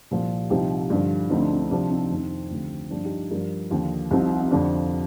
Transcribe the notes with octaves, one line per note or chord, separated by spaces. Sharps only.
C2 A#2 F3
C2 C3 F3 D#4 G4
G2 D3 F3
D2 D3 F3 C4 D#4
D4
C4
D4
C2 C3 F3 D4
C4 D#4
F2 C3 D#3
D2 D3 F3
G2 F3 D4 F4
D#4 G4
G2 F3 G4 A#4
D#2 D3 F3
C2 C3 F3 C4 D#4
C4
F2 D3 F3 D4